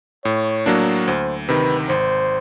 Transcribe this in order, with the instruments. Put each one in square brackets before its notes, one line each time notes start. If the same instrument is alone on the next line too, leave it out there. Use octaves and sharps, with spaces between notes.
[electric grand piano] A2 [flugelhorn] C#5
[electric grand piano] F#3 A#3 D4
[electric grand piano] D2 [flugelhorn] C5
[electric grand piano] C3 D#3 [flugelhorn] B4
[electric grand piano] G#1 [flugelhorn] C5